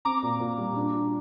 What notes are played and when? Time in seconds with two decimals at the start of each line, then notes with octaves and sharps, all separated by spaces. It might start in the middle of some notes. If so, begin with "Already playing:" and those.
0.05 C4 A#5 D6
0.23 A#2
0.40 A#2
0.58 G3
0.76 D4
0.94 F4